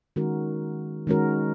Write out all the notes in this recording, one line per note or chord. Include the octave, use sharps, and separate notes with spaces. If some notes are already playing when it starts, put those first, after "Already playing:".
D#3 G#3 C#4 F#4 A#4
D#3 G#3 C#4 F#4 A#4